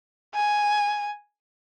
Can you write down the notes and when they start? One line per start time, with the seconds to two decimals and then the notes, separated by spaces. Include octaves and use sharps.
0.35 G#5